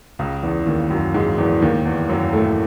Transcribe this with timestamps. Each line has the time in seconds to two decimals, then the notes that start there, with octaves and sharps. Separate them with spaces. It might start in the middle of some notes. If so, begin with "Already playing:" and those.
0.19 C#2 C#3
0.43 E2 E3
0.66 D#2 D#3
0.90 F#2 F#3
1.14 G#2 G#3
1.38 E2 E3
1.62 D#2 D#3
1.85 E2 E3
2.09 F#2 F#3
2.33 A2 A3